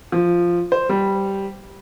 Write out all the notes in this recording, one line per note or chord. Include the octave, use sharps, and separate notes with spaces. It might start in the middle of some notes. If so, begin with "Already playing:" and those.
F3
C5
G3